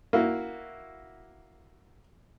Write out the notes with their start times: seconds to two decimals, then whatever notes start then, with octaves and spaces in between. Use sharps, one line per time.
0.13 A#3 E4 F#4